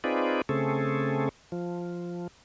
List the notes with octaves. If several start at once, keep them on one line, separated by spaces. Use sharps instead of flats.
C4 D#4 F4 G#4 B4 D5
C#3 A3 C4 G#4 A4
F3